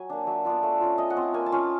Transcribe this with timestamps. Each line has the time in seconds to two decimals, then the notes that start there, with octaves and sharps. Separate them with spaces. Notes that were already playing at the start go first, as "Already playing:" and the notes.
Already playing: F#3 G#5
0.10 A#3 D4
0.27 F#3 E5
0.45 B3 D4 F4
0.63 A3
0.81 C#4 F4
0.98 A3 D#5
1.10 F#5
1.16 C4 F4
1.22 G#5
1.34 A#3 G#5
1.46 A5
1.52 C#4 F4